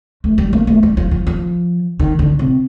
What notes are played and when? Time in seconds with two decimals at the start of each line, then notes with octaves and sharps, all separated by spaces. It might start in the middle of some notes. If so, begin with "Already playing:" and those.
0.24 A3
0.38 G3
0.53 A#3
0.67 A3
0.83 G3
0.97 F3
1.11 F3
1.27 F3
1.99 D#3
2.19 D3
2.39 C3